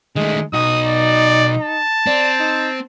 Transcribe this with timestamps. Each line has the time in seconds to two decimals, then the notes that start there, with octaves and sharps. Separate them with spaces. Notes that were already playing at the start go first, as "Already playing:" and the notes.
0.16 D#3 G#3 A3
0.53 B1 D#4 F#4 D#6
0.86 D5
1.61 A5
2.06 C4 D5
2.39 D#4